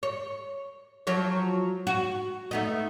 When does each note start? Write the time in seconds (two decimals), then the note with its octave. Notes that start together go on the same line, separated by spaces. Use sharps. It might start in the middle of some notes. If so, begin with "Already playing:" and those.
0.03 C#5
1.07 F3 F#3 C#5
1.87 F#4
2.51 A3 B3 D#4